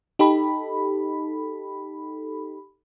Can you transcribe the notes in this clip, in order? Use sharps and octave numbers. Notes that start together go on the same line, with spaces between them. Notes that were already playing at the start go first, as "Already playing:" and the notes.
D#4 G4 A4 B5